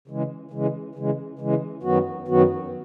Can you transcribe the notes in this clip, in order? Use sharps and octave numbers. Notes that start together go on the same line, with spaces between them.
C#3 E3 G#3
C#3 E3 G#3
C#3 E3 G#3
C#3 E3 G#3
F#2 D#3 F#3 B3 F#4
F#2 D#3 F#3 B3 F#4